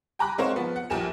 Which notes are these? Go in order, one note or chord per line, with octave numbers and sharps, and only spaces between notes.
G5 G#5 A#5 B5 D6 F#6
G#3 C4 A#4 C5 C#5 F5
F3 B3
F#5
A#1 F3 G4 A#4 G#5 E7